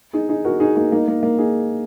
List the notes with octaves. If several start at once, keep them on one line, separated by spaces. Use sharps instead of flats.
D#4 G#4
D#4 G#4
F#4 A#4
D#4 G#4
A#3 D#4
A#3 D#4
A#3
A#3
D#4 G#4